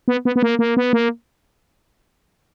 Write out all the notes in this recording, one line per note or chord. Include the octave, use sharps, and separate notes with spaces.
B3
B3
B3
A#3
A#3
B3
A#3